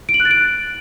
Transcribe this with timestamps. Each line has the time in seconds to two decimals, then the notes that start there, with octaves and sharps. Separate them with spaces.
0.09 D7
0.14 F#7
0.20 F#6
0.25 A6
0.31 D7